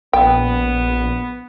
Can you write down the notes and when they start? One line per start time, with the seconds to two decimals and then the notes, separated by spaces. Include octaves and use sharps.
0.13 A#1 B3 G5